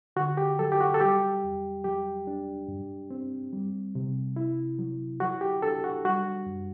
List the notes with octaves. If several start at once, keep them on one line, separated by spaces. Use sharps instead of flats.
D3 F#4
G4
F#3 A4
G4
F#4
A4
G3 G4
E2
F#3 G4
D4
G2
C4
G3
C3
E4
F#3
F#3 F#4
G4
D4 A4
F#4
G3 F#4
F#2